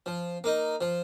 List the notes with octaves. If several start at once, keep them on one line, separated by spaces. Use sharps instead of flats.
F3
A#3 D#4
F3